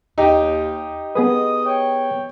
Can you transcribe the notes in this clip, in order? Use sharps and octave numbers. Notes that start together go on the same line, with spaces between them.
D#2 D#4 G4
B3 G#4 B4 D#5 D#6
C#5 G5